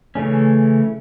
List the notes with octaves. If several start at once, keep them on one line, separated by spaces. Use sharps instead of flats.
C#3 E3 A3 C#4